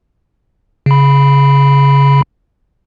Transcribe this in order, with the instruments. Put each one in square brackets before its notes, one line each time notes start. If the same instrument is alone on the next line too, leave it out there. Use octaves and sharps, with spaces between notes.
[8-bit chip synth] C#3 B5